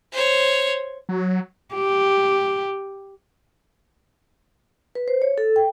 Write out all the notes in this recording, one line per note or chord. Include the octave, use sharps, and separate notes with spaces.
C5 C#5
F#3
G4
B4
C5
C#5
A4
G5